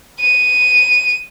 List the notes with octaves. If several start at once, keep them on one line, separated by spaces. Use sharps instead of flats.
D#7